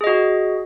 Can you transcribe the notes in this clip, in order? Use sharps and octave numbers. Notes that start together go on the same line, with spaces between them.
F#4 G#4 D#5